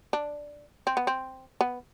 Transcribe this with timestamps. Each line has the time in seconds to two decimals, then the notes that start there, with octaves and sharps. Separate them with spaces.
0.13 D4
0.87 C4
0.97 B3
1.07 C4
1.61 B3